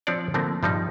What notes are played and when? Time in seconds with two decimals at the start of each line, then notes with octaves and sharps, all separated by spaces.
0.07 F3 C4 D4 C#5 D5
0.34 D3 F3 A3 A#3 C4
0.63 G2 F3 G3 G#3 D#4